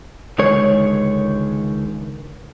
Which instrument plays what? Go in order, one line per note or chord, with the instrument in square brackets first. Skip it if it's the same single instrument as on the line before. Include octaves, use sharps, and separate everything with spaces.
[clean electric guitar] C#2 D3 D#3 G#3 C#5